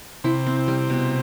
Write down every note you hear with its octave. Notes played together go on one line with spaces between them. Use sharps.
C3 E4
C4
G3
B2